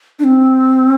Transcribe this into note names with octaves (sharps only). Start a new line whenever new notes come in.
D4
C4